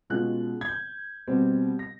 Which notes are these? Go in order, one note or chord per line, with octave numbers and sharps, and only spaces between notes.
B2 G#3 C#4 F4 F#6
G#6
G6
B2 G3 C4
A#6